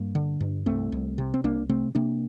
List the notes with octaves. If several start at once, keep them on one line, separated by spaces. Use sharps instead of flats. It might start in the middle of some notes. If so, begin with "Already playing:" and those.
Already playing: G2 G3 A#3
D3
G2
C2 A3 C4
C2
C3
C4
C2 A#3 D4
C3 A3 C4
C3 A#3 D4